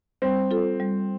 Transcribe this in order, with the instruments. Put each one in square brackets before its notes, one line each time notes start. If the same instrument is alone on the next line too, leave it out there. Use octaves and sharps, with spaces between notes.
[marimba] G3 [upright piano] C4
[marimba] F4 A4
G3